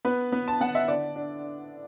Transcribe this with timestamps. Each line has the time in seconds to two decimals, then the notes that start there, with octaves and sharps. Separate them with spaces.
0.05 B3 B4
0.32 B3
0.48 A5
0.60 B3 F#5
0.75 E5
0.88 D3 D5
1.15 D4